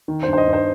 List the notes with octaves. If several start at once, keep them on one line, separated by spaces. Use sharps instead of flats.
D#3
C5
G2
C5
D#5
G2
C5